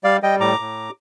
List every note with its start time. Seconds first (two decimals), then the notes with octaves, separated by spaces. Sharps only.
0.04 G3 D5 F5
0.23 G3 D#5 G5
0.40 A2 A#5 D6
0.59 A2